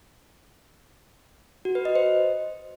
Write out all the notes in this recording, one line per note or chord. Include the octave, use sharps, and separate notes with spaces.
F#4
B4
D#5
C5